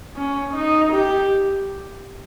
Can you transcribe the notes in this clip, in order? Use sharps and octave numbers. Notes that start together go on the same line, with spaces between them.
C#4
D#4
G4